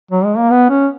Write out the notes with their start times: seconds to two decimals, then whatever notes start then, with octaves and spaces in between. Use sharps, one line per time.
0.11 F#3
0.24 G#3
0.37 A#3
0.50 B3
0.69 C#4